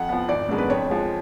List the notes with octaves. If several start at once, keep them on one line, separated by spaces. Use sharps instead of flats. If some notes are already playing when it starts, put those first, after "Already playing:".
Already playing: F2 F#5
F3 B3
G#1 D5
F#2 D3 G#3 B3
B4
F2 C#5
F3 G#3